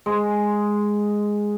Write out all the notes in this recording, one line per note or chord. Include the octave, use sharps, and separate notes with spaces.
G#3